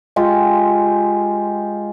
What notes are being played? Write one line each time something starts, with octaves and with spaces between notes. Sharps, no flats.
G#3 F4 G4